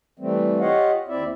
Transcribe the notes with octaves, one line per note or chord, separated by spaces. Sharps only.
E3 G3 A3 C4
F4 G4 C#5 D#5 F5 F#5
D#2 C4 E4 D5 E5